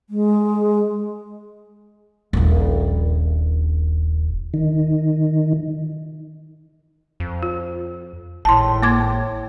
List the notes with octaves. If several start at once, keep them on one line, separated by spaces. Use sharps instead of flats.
G#3
D#1 A#1
D#3
F2
F4
G#1 A2 A5 C6
A#3 D6 G#6